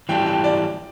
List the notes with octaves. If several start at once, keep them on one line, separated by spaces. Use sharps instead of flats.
E3 G3 E4 A4 G5
G5
D5